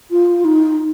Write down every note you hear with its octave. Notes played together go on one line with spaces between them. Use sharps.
F4
D#4